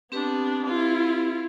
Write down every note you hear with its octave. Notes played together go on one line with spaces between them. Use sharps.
B3 C4 D4 G4 B4
E4 F4